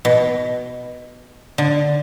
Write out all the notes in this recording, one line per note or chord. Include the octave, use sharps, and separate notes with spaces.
B2
D3